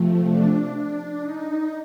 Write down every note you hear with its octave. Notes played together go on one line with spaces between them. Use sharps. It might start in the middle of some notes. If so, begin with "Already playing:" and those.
Already playing: C3 F3 A3
D4
D4
D#4